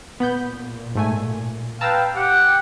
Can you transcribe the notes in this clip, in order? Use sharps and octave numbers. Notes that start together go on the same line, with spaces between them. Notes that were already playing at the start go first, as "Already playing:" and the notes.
A#2 B3 B5 G6
G#2 A3 G#5
B4 F5 G5 A5 A#5 E6
G4 F#5